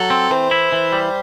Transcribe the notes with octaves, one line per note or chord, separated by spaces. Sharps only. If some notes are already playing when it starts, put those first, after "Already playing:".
Already playing: F#3 A4
C4
E3 C5
E4
E3
G3